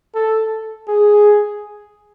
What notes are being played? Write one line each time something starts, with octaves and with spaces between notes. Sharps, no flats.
A4
G#4